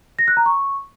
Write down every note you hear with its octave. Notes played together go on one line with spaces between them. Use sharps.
A#6
F#6
A#5
C#6